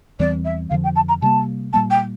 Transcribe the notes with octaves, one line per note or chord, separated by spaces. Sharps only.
E2 E3 G3 C4 D5
E5
F2 D3 F3 F5
G5
A5
A#5
C3 G3 A#3 A5
A#2 G3 A#3 A5
G5